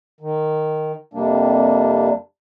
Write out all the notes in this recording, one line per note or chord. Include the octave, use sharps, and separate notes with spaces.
D#3
F2 C3 G3 A#3 D4